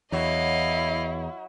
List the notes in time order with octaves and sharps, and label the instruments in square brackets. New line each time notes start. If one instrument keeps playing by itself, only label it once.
[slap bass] E2 [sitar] F#3 C#5 [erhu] E4 [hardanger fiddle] D#5 F5